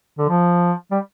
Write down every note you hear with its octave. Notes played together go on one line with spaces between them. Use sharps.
D3
F3
G3